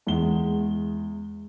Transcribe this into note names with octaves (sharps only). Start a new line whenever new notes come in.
E2 G#3 G7